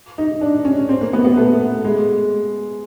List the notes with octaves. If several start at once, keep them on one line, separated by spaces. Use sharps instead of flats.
D#4
D4
C#4
C4
A#3
B3
B3
A3
G#3